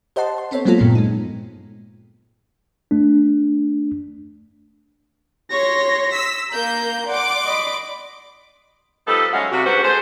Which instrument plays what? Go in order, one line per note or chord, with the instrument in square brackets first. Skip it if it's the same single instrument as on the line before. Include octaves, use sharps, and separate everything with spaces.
[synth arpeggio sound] G4 C5 D#5 F#5 A5 C6
C6
B3 C4 A4 C5 C#5
F#3 G#3 A#3 B3 F4 A4
G2 A#2 F3 B3 C4
G#3 D#4
[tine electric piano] A3 D4
[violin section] C#5 [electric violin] C6 A#6
[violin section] E6 B6
[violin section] A#3 G6 [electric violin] A#5
[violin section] D5 C6 D6 [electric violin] F#5
[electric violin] D#5 B5
[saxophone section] F3 G3 B3 D#4 A4
F#3 G#3 A3 C#4 F5 F#5
C3 F#4
G#2 G3 D4 F#4 B4 C5
G#3 G#4 A4 C5